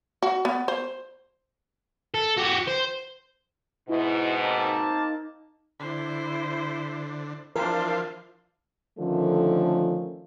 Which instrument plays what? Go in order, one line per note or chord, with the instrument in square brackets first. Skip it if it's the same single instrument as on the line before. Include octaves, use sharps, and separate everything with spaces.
[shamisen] F#4
B3
C5
[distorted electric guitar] A4
F#4 G4
C5
[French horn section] G#2 B2 [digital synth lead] E4
[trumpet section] A#3 C4 A5 [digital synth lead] D#4
[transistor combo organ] D3 [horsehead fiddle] E4 C5
[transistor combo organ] E3 F3 F4 [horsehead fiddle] D4 C5 [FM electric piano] A#4
[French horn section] D3 D#3 F3 A3 C#4